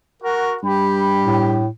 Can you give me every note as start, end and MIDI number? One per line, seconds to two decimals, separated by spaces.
0.22 0.55 66
0.22 0.56 70
0.63 1.65 43
0.63 1.64 67
0.63 1.51 79
0.63 1.51 83
1.23 1.68 45